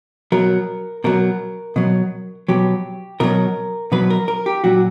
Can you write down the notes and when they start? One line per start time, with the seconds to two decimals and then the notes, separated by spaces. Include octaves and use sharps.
0.32 B2 F#3 A#4
1.04 B2 F#3 A#4
1.76 B2 F#3
2.48 B2 F#3 G4
3.20 B2 F#3 A#4
3.92 B2 F#3 B4
4.10 A#4
4.28 A#4
4.46 G4
4.64 A#2 F#3 F#4